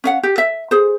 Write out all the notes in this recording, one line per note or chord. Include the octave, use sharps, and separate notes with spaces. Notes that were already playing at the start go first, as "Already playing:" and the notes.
C#4 F5 F#5
G4
E5
G#4 C5